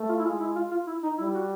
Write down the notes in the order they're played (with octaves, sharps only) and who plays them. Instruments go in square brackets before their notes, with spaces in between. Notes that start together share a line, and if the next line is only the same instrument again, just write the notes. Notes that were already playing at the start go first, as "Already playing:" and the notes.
Already playing: [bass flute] A3
[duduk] F4
E4
[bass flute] G#3 [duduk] F4
[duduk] E4
F4
F4
E4
D#4
[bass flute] G3 [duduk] E4
[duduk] F#4